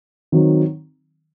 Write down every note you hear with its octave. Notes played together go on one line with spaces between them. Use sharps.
D#3 F#3 C4